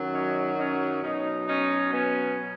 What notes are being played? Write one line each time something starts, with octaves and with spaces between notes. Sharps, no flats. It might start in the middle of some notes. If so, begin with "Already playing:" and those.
Already playing: F#2 D#3 F#3
C#4 D#4
C#4 D#4
B2 F#3 C#4 D#4
C#4 D#4
B3 C#4